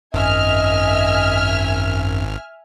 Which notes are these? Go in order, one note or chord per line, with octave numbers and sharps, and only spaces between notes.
G#1 F#2 D#5 E5 G#5 F6